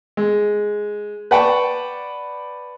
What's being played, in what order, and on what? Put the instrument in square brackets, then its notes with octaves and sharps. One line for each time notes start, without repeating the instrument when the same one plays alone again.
[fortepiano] G#3
B4 D5 F#5 G5 A5 C#6